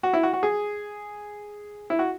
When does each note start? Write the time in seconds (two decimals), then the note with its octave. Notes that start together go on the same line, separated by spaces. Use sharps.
0.03 F#4
0.13 E4
0.23 F#4
0.33 F#4
0.43 G#4
1.90 E4
1.99 F#4